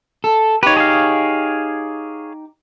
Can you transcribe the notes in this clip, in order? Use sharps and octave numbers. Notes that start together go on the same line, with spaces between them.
A4
D#4 G4 B4 C#5
G#4 C#5 F5